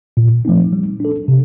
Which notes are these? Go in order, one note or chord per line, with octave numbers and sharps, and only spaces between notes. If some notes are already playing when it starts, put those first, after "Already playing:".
A#2
F3 A3 C4 D#4
G3
D4 A4
C3